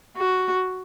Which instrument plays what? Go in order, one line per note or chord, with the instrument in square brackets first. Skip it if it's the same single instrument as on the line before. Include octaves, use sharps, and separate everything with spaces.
[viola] F#4